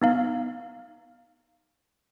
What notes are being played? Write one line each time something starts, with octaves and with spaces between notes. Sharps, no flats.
B3 D#4 F5